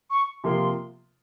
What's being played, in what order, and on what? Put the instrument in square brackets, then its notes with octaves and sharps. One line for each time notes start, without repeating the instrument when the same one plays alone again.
[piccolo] C#6
[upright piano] C3 F3 A#3 F4 [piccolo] C6